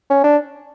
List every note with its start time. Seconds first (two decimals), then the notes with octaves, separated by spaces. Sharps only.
0.10 C#4
0.23 D4